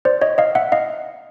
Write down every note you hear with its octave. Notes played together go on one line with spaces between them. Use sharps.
C5 D5
C#5 D#5
D#5 F5
E5 F#5
D#5 F5